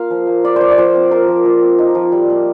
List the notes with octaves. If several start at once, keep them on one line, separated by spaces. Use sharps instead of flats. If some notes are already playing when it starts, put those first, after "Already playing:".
Already playing: A#3 F4 F5
F3
A#3
F4 D5
F3 C5 D5
D5
F3 C5
C4
F4 A#4
F3
F3
C4
D#4
F3
G3
A#3